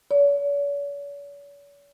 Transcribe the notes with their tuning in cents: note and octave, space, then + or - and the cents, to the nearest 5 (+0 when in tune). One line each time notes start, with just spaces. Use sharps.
C#5 +45